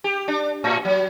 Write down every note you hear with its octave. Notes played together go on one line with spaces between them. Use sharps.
G4
D4
A2
F#3